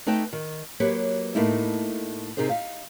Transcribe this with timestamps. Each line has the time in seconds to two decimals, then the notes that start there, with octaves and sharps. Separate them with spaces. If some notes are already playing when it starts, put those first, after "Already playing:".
0.06 A3 D#4 B4 D#5 G5 A5
0.33 D#3
0.80 F#3 A#3 G4 B4 C#5
1.35 A2 A3 A#3 D#4 E4
2.37 C3 D#4 G#4 A#4 C5
2.49 D#4 E5 F5